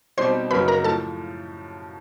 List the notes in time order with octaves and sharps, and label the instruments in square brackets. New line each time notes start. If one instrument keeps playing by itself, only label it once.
[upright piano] B2 G3 C4 D#4 G4 [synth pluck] C5 C6
[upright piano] F#2 C#3 F#3 A#3 D#4 [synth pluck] B4 B5
[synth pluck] A#4 A#5
[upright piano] A2 F3 A3 [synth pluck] A4 A5